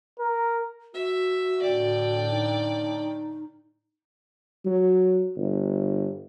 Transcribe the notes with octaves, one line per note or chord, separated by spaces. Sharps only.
A#4
F#4 E5
A2 D3 D5 G5
D#4
F#3
G1